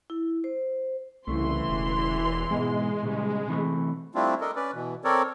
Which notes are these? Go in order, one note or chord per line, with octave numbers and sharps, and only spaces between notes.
E4
C5
C2 C#3 E3 A3 C6
E1
G#2 B2 G#3
A#2 C#3 G3
C3 E3 A3
G3 A3 C4 D4 E4 F4
D4 A4 A#4 D#5
C#4 B4 D5
B2 E3
C4 A4 A#4 C#5 D5